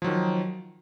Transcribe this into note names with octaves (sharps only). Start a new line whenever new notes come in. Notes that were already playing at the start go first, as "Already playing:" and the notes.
D#3 F3 F#3